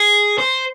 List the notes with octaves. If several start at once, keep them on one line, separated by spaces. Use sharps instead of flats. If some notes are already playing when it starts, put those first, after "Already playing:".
Already playing: G#4
C5